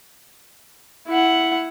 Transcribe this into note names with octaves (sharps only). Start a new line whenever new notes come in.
E4 F#5